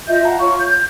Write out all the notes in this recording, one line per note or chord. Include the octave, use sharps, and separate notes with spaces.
F4 D#5 E5 G6
F5 F#5 A5 A#5
F4 C#5 C#6
G6